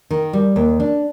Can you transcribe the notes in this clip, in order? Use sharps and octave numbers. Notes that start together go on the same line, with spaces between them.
D#3
G3
D#2
D4